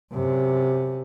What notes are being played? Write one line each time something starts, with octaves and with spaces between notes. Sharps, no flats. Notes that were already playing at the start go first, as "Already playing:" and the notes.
F#2 C3